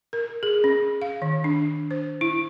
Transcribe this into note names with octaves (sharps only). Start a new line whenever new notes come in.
A#4
G#4
C#4
F5
D#3
D4
C5
E4